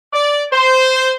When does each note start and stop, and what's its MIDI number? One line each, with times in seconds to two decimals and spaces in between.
0.13 0.43 74
0.52 1.15 72